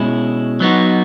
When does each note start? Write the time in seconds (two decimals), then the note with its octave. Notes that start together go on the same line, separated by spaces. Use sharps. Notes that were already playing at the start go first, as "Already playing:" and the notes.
Already playing: B2 G#3 C#4 E4
0.60 F#3 B3 D#4 F#4